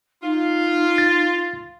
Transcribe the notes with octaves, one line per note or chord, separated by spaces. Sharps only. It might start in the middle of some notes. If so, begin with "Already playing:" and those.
D#4 F4
A6